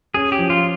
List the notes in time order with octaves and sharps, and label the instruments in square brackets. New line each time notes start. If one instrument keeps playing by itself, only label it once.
[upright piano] C#4 [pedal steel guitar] G#4
[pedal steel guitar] G4
[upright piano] F3
[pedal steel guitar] F4